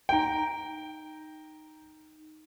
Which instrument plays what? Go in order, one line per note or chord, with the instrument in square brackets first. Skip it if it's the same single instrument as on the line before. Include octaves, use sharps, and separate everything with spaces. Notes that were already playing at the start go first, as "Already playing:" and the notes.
[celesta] D#4 D7 [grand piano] G5 A#5